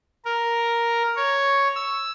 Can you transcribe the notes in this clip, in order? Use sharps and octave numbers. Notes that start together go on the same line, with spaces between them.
A#4
C#5
E6